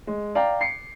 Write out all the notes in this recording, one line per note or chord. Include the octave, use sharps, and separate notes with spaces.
G#3
D5 F5 G5 A#5
C7 C#7